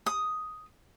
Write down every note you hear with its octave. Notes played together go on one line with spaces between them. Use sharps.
D#6